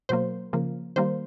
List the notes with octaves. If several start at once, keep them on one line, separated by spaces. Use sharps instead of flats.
B2 F#3 A#3 C5
C#3 F3 A#3
D#3 G3 A#3 C5